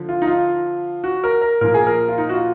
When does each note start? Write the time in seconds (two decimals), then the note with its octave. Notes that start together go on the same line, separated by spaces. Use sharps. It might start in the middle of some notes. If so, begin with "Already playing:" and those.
Already playing: D3 F3
0.09 F4
0.22 D#4
0.27 F4
1.04 F#4
1.24 A#4
1.41 A#4
1.61 A#2 F3 A#4
1.74 G#4
1.87 A#4
2.08 F4
2.18 D#4
2.29 F#4
2.33 F4